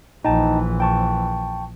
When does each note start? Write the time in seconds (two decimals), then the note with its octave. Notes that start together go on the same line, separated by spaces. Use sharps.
0.25 A#1 E3 D#4 G5 A5
0.80 G5 A5 C#6